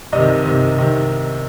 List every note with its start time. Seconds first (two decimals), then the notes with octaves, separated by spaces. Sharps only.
0.12 C2 C3 D#3 D#5
0.44 C2 C3 D#3
0.76 C3 D#3